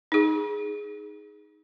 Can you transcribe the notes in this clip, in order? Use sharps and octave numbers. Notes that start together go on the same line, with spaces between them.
D#4 G#4